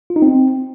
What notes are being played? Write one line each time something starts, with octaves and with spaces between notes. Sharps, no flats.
F4
D#4
C4